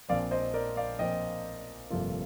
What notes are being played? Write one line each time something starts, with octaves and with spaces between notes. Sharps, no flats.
A#1 A#2 F3 C4 D5 F5
C5 D#5
A#4 D5
D5 F5
A#1 A#2 F3 C4 D#5 G5
G1 F2 C3 F3 A#3 F4 A4